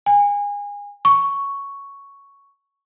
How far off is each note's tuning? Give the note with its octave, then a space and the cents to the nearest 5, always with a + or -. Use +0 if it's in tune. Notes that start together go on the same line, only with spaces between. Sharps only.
G#5 -30
C#6 +5